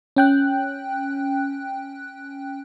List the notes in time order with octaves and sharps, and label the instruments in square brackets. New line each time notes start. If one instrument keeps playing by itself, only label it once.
[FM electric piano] C#4 G5 F#6